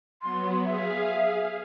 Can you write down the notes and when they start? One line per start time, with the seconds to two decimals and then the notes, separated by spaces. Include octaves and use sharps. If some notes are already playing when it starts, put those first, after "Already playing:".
0.22 F#3 B3 C6
0.66 G#4 E5 F5